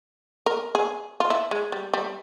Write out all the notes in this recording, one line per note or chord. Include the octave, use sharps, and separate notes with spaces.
A#4
G#4
F4
E4
G#3
G3
G3